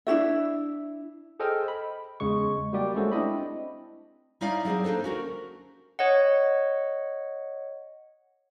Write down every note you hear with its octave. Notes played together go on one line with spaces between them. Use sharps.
D4 E4 F#4 E5
G#4 A4 C5 D#5 G5 F6
B5
E2 C#3 G#3 C#6
G3 A#3 F#4 G4 D5
G#3 A3 C#4 F#4 A4 C5
C4 D4 E4 D#5 B5
G3 C#4 D#4 E4 D5 F5
F#3 C4 G#4 C5 D5
A#3 D4 D#4 A4 C5
C#4 F#4 A#4
C#5 D#5 F#5